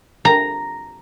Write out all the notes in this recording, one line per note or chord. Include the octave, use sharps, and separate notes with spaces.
A#5